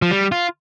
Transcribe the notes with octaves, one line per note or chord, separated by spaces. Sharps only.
F3
G3
F4